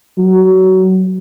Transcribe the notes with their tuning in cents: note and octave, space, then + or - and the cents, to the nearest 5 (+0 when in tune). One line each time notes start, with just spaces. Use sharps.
F#3 +20